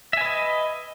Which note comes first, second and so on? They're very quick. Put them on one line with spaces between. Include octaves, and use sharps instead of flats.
E5 G#5 B4 D#5